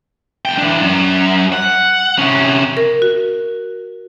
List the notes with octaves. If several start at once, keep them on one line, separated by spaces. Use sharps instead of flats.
E2 G5
E3 D4
F#2
F#5
C3 C#4
A#4
F#4